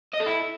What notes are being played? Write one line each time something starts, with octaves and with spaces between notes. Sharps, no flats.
D#5
A4
E4